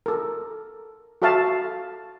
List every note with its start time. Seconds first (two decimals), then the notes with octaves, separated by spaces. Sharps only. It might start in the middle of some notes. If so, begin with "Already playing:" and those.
0.06 A4 A#4
1.22 F#4 A4 E5 F5 A5 C#6